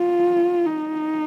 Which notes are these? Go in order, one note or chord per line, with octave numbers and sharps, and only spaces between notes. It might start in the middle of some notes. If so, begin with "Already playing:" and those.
Already playing: F4
D#4